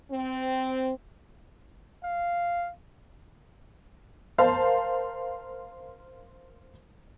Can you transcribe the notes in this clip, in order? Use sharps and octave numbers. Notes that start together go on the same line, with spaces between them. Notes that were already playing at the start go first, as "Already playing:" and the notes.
C4
F5
A#4 C5 F5 A5